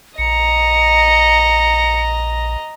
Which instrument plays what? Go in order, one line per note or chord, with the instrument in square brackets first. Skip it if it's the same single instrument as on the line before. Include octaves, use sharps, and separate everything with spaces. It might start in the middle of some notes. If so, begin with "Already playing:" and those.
[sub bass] A#1 [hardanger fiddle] D#5 A#5 [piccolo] C#7